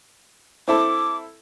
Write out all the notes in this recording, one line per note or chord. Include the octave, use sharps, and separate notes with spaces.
C4 E4 A4 D6